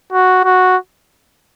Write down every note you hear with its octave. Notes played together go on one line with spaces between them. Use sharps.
F#4
F#4